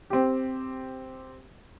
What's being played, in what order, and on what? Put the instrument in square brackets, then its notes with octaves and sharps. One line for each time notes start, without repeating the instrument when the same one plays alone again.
[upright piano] C4 G4